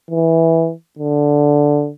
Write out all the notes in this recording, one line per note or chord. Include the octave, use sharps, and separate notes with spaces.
E3
D3